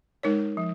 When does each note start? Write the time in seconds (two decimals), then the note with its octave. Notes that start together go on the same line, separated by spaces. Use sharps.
0.23 G#3 D#4 A#4 C#5
0.57 F3